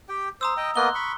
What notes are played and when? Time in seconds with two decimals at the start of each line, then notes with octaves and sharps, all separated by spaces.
0.09 G4 G5
0.41 C5 A#5 D#6 E6
0.57 D#5 G5
0.76 A#3 B3 D#5 C6 F#6 G7
0.95 B5 C#6